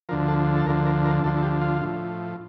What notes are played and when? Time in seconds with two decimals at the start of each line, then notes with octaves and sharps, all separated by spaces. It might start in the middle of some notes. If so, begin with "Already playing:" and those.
0.09 D2 D3 F3 A#4
0.28 A4
0.56 A4
0.66 D2 A#4
0.69 D3 F3
0.86 A#4
1.05 A#4
1.24 D2 D3 F3 A4
1.37 A4
1.43 G4
1.61 F4
1.81 A2 F3